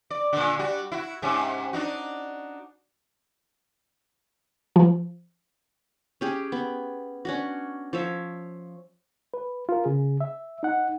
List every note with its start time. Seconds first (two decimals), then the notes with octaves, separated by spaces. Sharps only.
0.10 D5
0.33 A#2 D3
0.59 G3 F#4
0.92 E4 F#4
1.22 G#2 C3 C#4
1.73 D4 D#4 F#4
4.76 F3
6.21 C#4 G4 G#4
6.52 B3
7.25 C#4 D4 F#4
7.93 F3 C#5 E5
9.34 B4
9.69 F4 A#4
9.85 C#3 G#4
10.21 E5
10.63 D#4 F#5